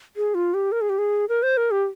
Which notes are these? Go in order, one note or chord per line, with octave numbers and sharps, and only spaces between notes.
G#4
F4
G4
A#4
G#4
G4
G#4
A#4
C5
A#4
G4